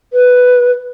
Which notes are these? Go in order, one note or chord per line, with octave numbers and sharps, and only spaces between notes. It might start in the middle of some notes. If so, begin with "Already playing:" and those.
B4